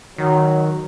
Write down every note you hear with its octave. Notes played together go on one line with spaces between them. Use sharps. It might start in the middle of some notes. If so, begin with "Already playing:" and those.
D#3 F#3